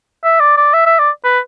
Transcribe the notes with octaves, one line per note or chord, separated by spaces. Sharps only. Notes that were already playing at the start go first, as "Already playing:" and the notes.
E5
D5
D5
E5
E5
D5
B4